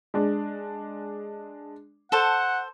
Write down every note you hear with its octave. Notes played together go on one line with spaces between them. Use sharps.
G#3 D4
A4 C5 F#5